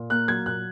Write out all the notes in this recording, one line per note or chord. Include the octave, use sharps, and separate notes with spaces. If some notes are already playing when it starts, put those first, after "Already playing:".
Already playing: A#2
A#3 F#6
F#3 G#6
A#2 F#6